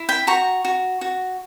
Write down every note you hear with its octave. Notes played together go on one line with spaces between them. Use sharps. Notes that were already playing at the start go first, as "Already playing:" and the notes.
Already playing: E4
G5 B5
F#4 A#5 C#6
F#4
F#4